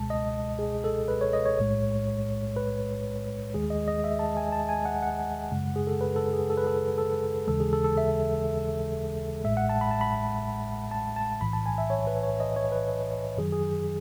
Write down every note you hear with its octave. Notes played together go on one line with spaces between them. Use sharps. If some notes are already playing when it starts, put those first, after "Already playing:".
Already playing: C#2 B2 G#3 A5
D#5
G#4
A4
B4
C#5
D#5
C#5
B1 A2 G#3
B4
D#2 D#3 G#3 G#4
D#5
D#5
E5
A5
G#5
A5
G#5
F#5
F#5
F#2 C#3 G#3
G#4
A4
B4
A4
G#4
A4
B4
A4
A4
D#2 C#3 E3 G#3 A4
G#4
A4
A4
E5
A1 A2 G#3 E5
F#5
A5
B5
A5
B5
A5
A5
B1 A2 E3 B5
A5
G#5
E5
C#5
B4
C#5
D#5
C#5
B4
F#2 D#3 F#3 G#4
G#4